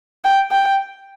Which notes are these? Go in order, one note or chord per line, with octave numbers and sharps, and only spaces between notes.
G5
G5